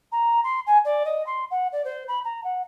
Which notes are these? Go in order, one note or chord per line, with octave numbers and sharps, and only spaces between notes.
A#5
C6
G#5
D5
D#5
C6
F#5
D5
C5
B5
A#5
F#5